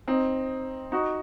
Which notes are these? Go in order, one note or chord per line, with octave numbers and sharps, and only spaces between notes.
C4 D#4
D#4 F#4